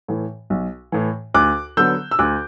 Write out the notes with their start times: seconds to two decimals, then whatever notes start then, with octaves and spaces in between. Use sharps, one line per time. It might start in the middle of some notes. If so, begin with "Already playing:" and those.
0.08 A2 E3
0.50 B1
0.92 A2 E3
1.34 D2 D6 F#6
1.77 D3 F#3 B3 E6 G6
2.11 E6
2.19 D2 D6 F#6